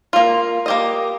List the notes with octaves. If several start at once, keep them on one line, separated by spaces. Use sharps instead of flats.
A#3 F4
A#3 G4 D#5